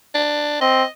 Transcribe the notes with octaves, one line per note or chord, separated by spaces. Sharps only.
D4
C4 D#5